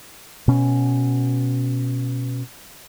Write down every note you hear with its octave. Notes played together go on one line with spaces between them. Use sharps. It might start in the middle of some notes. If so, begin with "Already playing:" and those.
B2 C#4